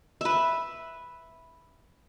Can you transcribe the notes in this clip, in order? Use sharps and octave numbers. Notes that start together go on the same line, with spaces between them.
B4 E5